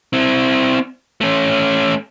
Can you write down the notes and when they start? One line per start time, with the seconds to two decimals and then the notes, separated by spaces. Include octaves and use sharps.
0.13 C4 E4
1.21 A3 C#4